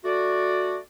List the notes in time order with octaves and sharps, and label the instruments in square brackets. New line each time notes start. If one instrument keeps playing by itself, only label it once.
[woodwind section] A3 F#4 D5